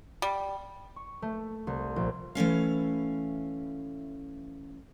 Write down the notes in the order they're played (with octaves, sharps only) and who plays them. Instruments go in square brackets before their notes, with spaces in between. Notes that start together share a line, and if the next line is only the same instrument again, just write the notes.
[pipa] G3
[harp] C#6
A3
C2
A#1
[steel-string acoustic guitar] E3 A3 C#4 F5